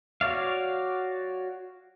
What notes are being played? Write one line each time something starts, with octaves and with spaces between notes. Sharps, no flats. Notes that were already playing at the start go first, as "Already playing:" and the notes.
F#4 C#5 D5 F5